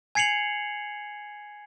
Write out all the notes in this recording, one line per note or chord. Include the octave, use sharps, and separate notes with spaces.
G#5 G#6 C7 C#7 F7 F#7